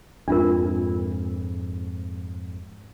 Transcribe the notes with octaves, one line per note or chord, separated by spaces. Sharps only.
F2 G#2 D4 F4 A#4